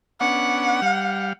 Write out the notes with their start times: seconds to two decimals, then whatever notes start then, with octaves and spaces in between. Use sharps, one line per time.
0.21 B3 C#4 D4 F#5
0.82 G3 F5